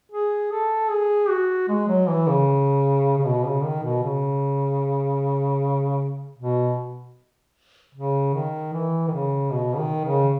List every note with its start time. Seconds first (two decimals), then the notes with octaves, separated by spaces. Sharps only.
0.12 G#4
0.52 A4
0.90 G#4
1.29 F#4
1.68 G#3
1.88 F#3
2.07 E3
2.28 C#3
3.18 C#3
3.25 B2
3.45 C#3
3.64 D#3
3.83 B2
4.03 C#3
6.39 B2
7.95 C#3
8.34 D#3
8.73 E3
9.07 D#3
9.13 C#3
9.51 B2
9.74 C#3
9.78 D#3
10.04 C#3